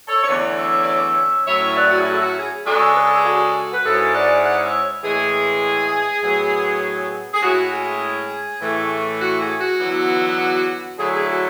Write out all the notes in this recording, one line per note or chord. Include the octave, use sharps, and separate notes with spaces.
A4 C#5
C#5
E2 D3 A3 C#4 B4 D5
C#5 E5
D5
C#5 E5
A2 F#3 C#4 E4 C#5 E5
B4 D5
F#4
G#4
F#4 A4
F#4
G#4
C#3 G#3 D4 F#4 A4
B4
A4
G#4
F#4 A4
B4
G#2 G#3 C#4 E4 F#4 A4
D5 F#5
D5 F#5
C#5 E5
A2 E3 G#3 G#4
A2 F#3 B3
G#4
A2 G#3 C#4 E4 F#4
G#4
A2 E3 A3
F#4
G#4
F#4
E2 D3 F#3 B3 E4
D3 F#3 A3 E4 G#4
G#4
F#4